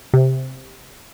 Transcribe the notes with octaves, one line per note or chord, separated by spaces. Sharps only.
C3